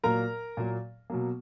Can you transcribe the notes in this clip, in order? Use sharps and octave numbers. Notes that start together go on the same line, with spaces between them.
A#2 F#3 A#3 A#4 A#5
A#2 F#3 A#3
B2 F#3 A#3